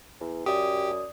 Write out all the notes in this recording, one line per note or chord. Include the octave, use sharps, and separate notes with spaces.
E2
F#2 G4 D5 D#6